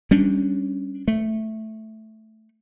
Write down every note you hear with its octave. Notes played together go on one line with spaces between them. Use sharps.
G3 C#4 D4
A3